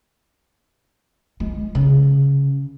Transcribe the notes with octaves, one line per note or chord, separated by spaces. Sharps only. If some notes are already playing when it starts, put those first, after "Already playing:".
G#3
C#3